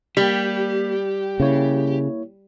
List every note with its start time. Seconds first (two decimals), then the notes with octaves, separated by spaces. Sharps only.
0.17 G3 A#3 G4 B6
1.40 C#3 A#3 E4 C#5